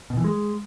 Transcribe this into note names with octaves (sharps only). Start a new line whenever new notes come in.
B2
E3
G#3